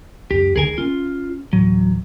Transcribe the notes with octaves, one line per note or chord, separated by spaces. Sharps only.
C#2 F#2 G4
C#2 D3 D#3 G#4 A#4 G#5
A#3 C#4 F4
D1 A2 E3 F#3